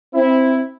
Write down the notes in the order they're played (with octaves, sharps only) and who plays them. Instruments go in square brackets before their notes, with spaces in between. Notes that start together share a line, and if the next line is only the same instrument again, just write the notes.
[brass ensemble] C4 E4